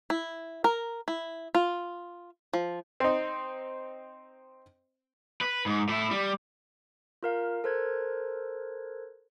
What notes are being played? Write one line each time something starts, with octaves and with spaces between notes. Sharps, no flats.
E4
A#4
E4
F4
F3
C4 D#4
B4
G#2
A2 E4
G3
F4 A#4 F5
A4 A#4 C5 F#6 G#6